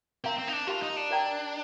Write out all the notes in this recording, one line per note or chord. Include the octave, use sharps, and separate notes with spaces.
C4 A#4 F5 A#5
C4
D#4
D4
F4 G4 A#4 F5 A5 C6
D#4
D4
A#4 D5 G5 A#5